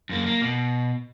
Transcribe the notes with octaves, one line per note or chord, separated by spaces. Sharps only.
F#2 A#3
A#3
B2